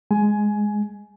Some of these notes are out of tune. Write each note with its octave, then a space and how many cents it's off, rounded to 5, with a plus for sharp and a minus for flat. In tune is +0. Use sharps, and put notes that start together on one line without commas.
G#3 +0 G#5 +15